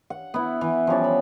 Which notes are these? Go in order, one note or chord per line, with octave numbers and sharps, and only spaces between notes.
F#5
B3 E4
E3
F3 G3 C#4 D5
B5